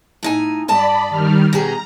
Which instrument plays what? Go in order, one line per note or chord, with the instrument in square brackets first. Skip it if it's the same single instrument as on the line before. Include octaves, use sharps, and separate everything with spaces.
[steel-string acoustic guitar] A2 D#4 G#5
[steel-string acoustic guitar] G2 D#5 A5 [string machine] D5 B5
[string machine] D#3 G3 F6
[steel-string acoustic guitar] B2 G4 G#4 [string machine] A#5